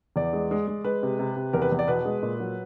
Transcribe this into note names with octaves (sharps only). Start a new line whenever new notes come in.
E2 D5
G#3
G#3
G#3
G#3 B4
C3
C3
C3
E2 A#4
B4
E2
D5
B2 B4
G#3
A#2
F#3